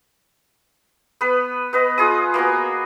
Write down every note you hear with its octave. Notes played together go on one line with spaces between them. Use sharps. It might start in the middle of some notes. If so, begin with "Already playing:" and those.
B3 B4
B3 B4 D#5
F4 G#4 D#6
A#3 B3 F#4 G#5